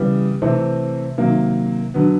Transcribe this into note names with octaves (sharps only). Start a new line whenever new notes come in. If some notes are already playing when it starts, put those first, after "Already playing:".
Already playing: C#3 E3 G3 B3
C3 E3 A3 C4
C3 D#3 F#3 A#3
D3 F#3 B3